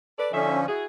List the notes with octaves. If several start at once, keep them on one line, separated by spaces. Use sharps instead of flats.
A4 B4 D5
D3 F3 C#4 D#4 E5
E4 F#4 G#4